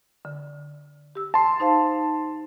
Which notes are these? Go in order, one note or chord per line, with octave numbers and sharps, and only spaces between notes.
D3
G4 E6
A5 C6
D#4 C5 F5